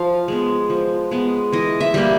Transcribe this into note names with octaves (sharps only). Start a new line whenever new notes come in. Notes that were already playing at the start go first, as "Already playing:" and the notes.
Already playing: F3 F5
G#3 B3
F3
G#3 B3
E3 D#5
E5
G3 A#3